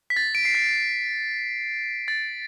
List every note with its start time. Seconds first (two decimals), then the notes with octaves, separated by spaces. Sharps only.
0.10 B6
0.16 A6
0.35 D7
0.45 C7
0.55 B6
2.08 A6